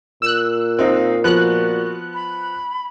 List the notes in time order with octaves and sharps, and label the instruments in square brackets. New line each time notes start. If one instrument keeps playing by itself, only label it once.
[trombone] A#2 [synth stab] E6 F#6
[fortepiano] C4 D#4 [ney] F5
[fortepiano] F3 B3 [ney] F#4 [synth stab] F#6
[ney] B5